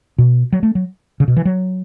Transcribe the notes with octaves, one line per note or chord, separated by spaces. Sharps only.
B2
F#3
A3
F#3
C#3
B2
E3
F#3